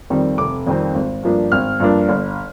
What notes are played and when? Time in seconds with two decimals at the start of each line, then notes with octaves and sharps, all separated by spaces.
0.10 F2 D#3 G3 C4
0.38 F1 D6
0.67 F2 D#3 G3 C4
0.95 G#1
1.23 G2 F3 A#3 D4
1.52 G#1 F6
1.80 G2 F3 A#3 D4
2.09 G1